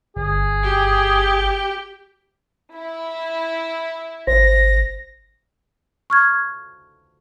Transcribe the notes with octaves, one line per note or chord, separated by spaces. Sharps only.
G1 G#4
G4
E4
G#1 C5 A#6
C#6 F6 G#6